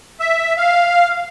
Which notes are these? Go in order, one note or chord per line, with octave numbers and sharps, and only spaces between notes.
E5
F5